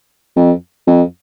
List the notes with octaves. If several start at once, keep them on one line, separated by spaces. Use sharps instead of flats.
F2
F2